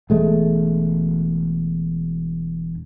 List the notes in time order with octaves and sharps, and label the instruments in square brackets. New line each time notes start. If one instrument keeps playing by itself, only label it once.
[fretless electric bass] E1 G#3 A3